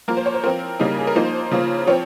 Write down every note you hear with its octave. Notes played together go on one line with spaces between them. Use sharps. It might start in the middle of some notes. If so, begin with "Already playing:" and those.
F3 A#3 F4 A#4
C5
C#5
C5
F3 C4 F4 A#4
C#3 G3 A#3 D#4
G#4
A#4
F3 A#3 D#4 C5
C#3 F3 A#3 F4
F3 C4 C#5